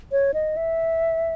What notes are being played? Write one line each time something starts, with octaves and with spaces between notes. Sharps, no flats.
C#5
D#5
E5